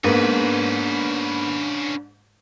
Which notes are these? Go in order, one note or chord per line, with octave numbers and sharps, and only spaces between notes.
G#2 A#3 B3 C#4 D4 B4